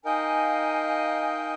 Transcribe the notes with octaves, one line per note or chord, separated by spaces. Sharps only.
D#4 A#4 D#5 F5 G5 G#5